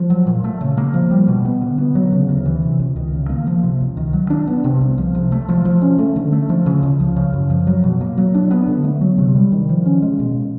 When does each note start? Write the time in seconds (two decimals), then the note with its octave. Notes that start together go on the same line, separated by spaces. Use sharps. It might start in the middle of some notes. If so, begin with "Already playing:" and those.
Already playing: F3
0.10 F#3
0.27 A#2
0.44 A3
0.61 C#3
0.77 A#3
0.94 F3
1.11 G3
1.28 B2
1.45 B3
1.61 D3
1.78 B3
1.95 F#3
2.12 C#3
2.29 D2
2.45 E3
2.62 C3
2.79 C#2
2.96 D#3
3.13 C#3
3.29 A#3
3.47 F3
3.63 C3
3.81 C#2
3.97 D#3
4.13 F#3
4.30 D4
4.47 B3
4.64 C3
4.81 C2
4.98 F3
5.15 C3
5.32 A3
5.49 F3
5.65 F3
5.82 C#4
5.99 A3
6.16 D3
6.32 A3
6.49 F3
6.66 C#3
6.83 C#2
7.00 F3
7.16 C#3
7.33 F#2
7.50 F3
7.67 F#3
7.84 B2
8.01 A#3
8.18 F#3
8.34 D4
8.51 B3
8.68 D3
8.84 A3
9.01 F#3
9.18 C3
9.35 G3
9.52 D#3
9.69 F3
9.86 C#4
10.02 G#3
10.20 B2